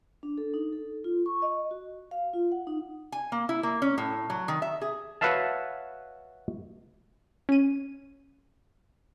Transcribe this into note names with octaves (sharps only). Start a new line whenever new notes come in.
D4
A4
D#4
A4
F4
C#6
D#5
F#4
F5
F4
F#5
D#4
G#5
A#3
E4
A#3
C#4
A2
F#3
D#3
E5
G#4
F#4 B4 C#5 E5 F5 A5
C#4 D#7